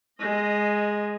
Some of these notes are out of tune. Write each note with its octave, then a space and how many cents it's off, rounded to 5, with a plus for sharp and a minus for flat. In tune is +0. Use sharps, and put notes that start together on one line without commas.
G#3 +0 D#5 -15